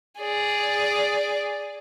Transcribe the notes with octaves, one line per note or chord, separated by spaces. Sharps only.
G#4 D5